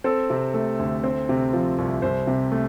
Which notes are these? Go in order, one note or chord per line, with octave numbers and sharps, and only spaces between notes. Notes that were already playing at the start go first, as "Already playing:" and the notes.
C4 A4
C3
A3
D2
C4
C3
F3
C2
C2 C5
C3
A3